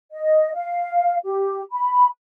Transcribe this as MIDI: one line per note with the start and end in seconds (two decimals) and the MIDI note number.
0.12 0.52 75
0.54 1.16 77
1.25 1.61 67
1.72 2.07 83